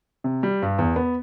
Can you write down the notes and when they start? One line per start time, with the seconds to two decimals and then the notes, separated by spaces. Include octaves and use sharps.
0.24 C3
0.43 G3
0.62 G2
0.79 E2
0.96 B3